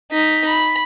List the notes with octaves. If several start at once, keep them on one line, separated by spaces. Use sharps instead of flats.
D#4 B6
B5